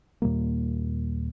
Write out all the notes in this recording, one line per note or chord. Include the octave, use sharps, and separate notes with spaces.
D#2 A#2 G3 A#3